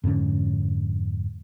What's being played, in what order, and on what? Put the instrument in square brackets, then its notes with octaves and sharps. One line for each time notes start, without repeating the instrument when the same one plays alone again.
[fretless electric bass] F2 G#2 D3 C#4